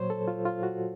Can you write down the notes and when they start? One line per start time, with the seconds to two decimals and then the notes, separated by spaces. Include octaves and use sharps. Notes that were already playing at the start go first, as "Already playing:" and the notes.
Already playing: A#2 F#3 C5 C#5
0.10 A4
0.28 F4
0.45 F4
0.63 F#4